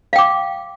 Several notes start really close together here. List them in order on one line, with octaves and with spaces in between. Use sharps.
F5 G5 D6